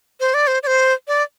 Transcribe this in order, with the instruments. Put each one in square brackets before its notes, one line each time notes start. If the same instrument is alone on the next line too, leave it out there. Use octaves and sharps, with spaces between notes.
[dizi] C5
D5
C5
D5
C5
D5